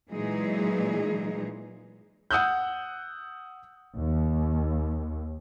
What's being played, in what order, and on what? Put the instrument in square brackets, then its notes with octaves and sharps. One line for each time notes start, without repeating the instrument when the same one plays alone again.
[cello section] A#2 E3 F#3 G#3 D#4 G#4
[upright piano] F#5 D#6 E6 F#6 G6
[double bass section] D#2